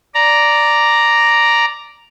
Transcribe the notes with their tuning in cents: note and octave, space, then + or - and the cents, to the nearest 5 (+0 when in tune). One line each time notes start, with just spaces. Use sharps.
D5 +0 A#5 +0